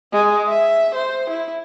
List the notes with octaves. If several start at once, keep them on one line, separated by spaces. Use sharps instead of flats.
G#3
E5
C5
E4